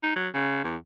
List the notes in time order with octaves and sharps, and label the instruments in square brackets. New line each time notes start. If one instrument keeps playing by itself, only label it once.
[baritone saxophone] D#4
F#3
C#3
E2